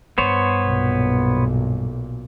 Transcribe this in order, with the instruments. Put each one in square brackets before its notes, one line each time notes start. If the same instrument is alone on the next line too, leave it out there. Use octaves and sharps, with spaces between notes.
[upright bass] G2 [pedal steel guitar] B3 C5 C#5
[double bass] B1 A#2